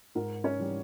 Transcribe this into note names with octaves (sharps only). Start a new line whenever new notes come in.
G#2 A#4
C#4 C#5
E3 G3